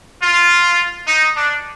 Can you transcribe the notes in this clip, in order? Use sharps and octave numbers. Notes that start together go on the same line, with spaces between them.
F4
D#4
D4